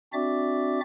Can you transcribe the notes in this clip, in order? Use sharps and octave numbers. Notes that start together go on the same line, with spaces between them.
C4 D4 F#4 D5 E5 D6